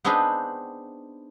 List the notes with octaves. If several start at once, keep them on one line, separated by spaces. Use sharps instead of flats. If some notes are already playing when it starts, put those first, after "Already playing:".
B3 C4 D4 D#4 G#4 B4